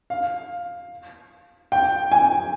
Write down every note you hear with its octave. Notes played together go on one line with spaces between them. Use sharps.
F5
G5
G#5